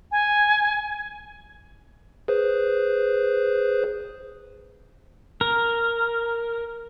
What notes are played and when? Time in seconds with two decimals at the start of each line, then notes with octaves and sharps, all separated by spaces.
0.12 G#5
2.28 G#4 B4 C5
5.41 A#4